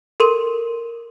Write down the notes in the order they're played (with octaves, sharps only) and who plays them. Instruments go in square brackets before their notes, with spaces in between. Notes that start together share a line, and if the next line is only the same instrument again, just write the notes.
[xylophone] A4 A#4 C6 D#7